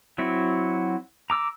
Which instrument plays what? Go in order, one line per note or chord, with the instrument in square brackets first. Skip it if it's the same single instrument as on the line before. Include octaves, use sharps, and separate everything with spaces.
[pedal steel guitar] F#3 C4 E4 F#4
A#5 D6 E6